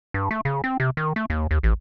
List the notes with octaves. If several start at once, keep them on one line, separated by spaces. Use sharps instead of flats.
G2
A3
C#3
C4
C3
D#3
A3
D#2
D#2
A1